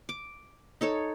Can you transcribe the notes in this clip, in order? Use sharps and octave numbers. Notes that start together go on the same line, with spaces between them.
D6
D#4 A4 C#5